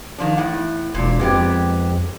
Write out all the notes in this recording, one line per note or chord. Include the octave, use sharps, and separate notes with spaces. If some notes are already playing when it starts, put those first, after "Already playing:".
D#3 F3 D4
E2 A2 F#5
E1 A#2 D4
F2 G#3 B3 G4